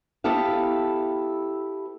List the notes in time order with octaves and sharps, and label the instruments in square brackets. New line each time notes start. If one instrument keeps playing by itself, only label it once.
[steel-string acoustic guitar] B3 E4 G4 A4 F5